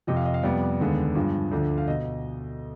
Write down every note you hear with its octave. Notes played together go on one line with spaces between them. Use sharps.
F2 C3 F3 D#5
F5
D#5
F5
F2 C3 G3 B3 D5
D#2 D3 G#3 B3
G2 F3 G#3
D2 D3 F3
F5
B2 D#5